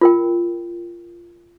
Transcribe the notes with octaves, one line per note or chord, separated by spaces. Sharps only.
F4 A#4 G5